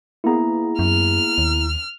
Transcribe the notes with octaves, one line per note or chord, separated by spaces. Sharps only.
A#3 B3 E4 G#4 A#5
F#2 F6
D#2